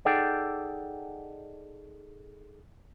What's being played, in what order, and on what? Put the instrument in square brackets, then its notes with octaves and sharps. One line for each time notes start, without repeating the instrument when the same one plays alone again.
[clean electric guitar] D#4 G#4 A4 D5 F#5 G5